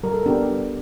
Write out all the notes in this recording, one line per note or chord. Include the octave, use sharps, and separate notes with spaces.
G3 A#4
A4
B3 D4 G4 A#4
G3